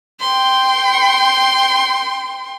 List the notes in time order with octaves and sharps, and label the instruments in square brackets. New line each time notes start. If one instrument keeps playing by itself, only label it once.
[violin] G5 C6